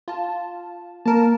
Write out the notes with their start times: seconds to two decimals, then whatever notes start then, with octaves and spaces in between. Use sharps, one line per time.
0.08 F4 A5
1.06 A#3 A#4 A5